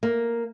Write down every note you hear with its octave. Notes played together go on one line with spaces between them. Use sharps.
A#3